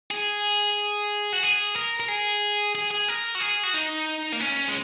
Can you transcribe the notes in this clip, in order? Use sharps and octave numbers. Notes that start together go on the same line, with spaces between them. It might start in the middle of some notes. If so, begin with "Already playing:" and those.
G#4
F#4
G#4
A#4
A#4
G#4
G#4
G#4
A#4
F#4
G#4
F#4
D#4
A#3
C#4
G#3